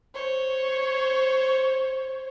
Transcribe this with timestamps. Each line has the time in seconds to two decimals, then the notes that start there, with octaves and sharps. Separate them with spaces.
0.15 C5 C#5